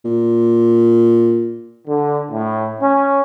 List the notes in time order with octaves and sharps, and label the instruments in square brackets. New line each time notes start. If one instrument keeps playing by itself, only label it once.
[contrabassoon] A#2
[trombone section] D3
A2
C#4